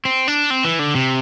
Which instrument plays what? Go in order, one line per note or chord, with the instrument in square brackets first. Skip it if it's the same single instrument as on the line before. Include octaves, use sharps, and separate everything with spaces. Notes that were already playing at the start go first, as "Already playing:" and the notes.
[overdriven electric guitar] C4
D4
C4
E3
D3
C3